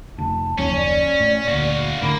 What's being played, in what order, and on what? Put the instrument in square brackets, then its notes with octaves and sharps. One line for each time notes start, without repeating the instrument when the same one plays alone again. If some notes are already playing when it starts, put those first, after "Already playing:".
[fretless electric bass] F1 [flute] A5
[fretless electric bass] F#1 D#2 F3 [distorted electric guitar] C#4 [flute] C#5
[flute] D5
[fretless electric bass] A2
[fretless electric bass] D2 A#2 [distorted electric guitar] F#4 F5
[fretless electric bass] A2 D3 [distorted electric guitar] A#3 [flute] B5